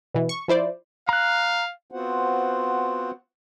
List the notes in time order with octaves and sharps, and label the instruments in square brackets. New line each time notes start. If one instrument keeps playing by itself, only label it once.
[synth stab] B2 E3
C#6
F3 E4 C5 D5
[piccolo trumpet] F5 [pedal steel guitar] A#5 F#6
[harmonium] B3 C4 F4 F#4 C5 F#5